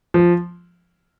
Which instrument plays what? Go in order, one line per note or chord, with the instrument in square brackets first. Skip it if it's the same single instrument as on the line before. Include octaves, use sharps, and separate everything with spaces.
[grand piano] F3